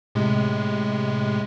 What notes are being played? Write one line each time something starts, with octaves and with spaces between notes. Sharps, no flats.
A2 C3 G#3